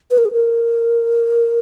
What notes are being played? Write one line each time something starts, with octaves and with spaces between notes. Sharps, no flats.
B4
A#4
G#4
A#4